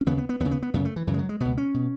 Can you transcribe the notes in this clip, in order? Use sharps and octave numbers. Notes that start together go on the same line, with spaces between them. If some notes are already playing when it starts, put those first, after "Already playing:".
C#4
D#2 C#3 B3
B3
B3
D#2 C#3 B3
B3
B3
F#2 C#3 B3
A3
E3
F#2 C#3 E3
G#3
F#3
G#3
C#2 B2 B3
C#4
B2